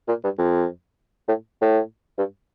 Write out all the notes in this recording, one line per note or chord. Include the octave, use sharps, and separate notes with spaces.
A#2
G2
F2
A2
A2
G2